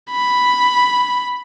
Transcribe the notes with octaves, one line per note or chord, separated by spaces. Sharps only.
B5